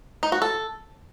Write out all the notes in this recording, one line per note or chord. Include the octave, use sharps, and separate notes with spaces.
D#4
F#4
A4